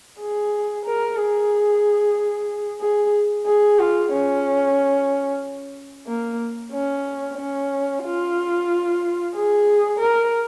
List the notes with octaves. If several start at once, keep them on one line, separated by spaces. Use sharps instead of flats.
G#4
A#4
G#4
G#4
G#4
F4
C#4
A#3
C#4
C#4
F4
G#4
A#4